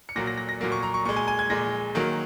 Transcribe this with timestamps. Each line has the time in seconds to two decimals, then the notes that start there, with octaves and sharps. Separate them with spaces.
0.09 C#7
0.16 A#2 F#3 A#3 A#6
0.27 A#6
0.38 A#6
0.49 A#6
0.61 A#2 F#3 A#3
0.72 C#6
0.83 A#5
0.94 C#6
1.05 A#2 G#3 C#6
1.16 G#5
1.28 G#5
1.39 G#6
1.50 A#2 G#3 A#6
1.95 D#3 F#3 A#3